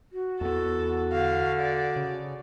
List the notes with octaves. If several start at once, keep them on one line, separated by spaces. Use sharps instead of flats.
F#4
E2 B3 A4
D3 F5
D5
C#3